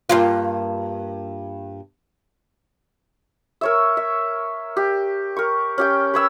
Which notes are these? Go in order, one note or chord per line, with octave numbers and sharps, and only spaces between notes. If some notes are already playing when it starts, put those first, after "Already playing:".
G2 A#3 F4
A#4 C#5 E5
E5
G4
A#4 C#6
C#4 G4 G5
B4 C#5 E6